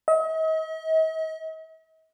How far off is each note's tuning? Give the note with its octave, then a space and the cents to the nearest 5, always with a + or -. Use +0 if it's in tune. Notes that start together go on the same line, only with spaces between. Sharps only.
D#5 +45